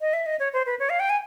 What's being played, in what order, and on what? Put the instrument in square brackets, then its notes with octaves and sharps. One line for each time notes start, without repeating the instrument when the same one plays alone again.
[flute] D#5
E5
D#5
C#5
C5
B4
C#5
F5
G5
G#5